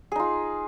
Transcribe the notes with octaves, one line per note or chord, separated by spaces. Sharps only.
D#4 F4 G#4